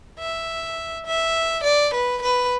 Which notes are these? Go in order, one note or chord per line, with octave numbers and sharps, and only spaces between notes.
E5
E5
D5
B4
B4